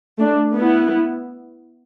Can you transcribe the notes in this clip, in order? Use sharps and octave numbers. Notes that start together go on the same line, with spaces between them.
A3 D4
B3 E4